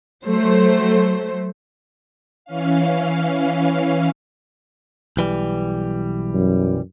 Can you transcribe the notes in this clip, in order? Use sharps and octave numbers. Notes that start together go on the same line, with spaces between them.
F#3 A3 C5
E3 C#4 F5
B1 E3 G3
F#2